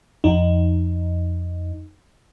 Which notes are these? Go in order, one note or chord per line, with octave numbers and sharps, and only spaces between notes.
F2 D#4